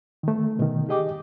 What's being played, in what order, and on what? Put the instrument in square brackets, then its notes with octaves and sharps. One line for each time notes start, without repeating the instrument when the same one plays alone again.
[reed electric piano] D#3 A3
B2 D#3
G4 G#4 D#5 G5 D6